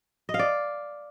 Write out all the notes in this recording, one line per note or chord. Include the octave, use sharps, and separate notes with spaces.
D#5
F5
D5